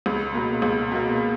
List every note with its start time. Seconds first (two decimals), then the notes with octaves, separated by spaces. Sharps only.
0.06 C#2
0.34 B2 A#3
0.62 C#2
0.91 B2 A#3